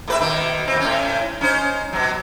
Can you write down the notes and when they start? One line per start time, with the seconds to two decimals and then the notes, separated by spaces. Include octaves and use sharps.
0.08 A2 B4 E5
0.20 B2 D#3
0.68 D#2 C4
0.80 A2 C#4
1.41 C#4 D#4 C5
1.93 B2 F#3